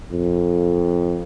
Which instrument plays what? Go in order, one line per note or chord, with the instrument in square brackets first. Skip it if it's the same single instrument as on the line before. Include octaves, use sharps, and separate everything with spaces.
[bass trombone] F2